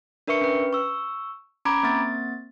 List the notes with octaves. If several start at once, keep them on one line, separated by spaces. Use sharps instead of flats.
D4 A#4 B4 E5 C#6 C#7
C#4 B4
C#6 E6
C#4 A#5 B5 D6 G#6 D7
A#3 C4 A6